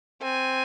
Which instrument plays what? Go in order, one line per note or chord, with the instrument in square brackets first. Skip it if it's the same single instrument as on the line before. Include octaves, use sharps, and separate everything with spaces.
[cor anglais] C4 [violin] G#5